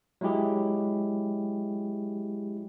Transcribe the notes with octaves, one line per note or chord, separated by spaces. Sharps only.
F#3 G#3 E4 G4 G#4